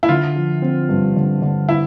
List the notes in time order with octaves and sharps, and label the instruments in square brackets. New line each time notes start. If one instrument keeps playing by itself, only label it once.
[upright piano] E4
[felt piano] D3 [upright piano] F4
[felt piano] F3
C4
G2
D3
D3
[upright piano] E4